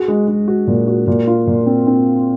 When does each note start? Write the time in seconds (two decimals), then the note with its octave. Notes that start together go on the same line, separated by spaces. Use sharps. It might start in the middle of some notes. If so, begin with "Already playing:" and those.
Already playing: F#4 G#4
0.08 G#3
0.28 G#3
0.48 F#4
0.67 A#2
0.88 F#4
1.07 A#2
1.27 F4
1.47 A#2
1.67 C4
1.87 C4